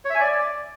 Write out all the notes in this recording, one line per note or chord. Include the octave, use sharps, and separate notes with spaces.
C#5
E5
G#5
D5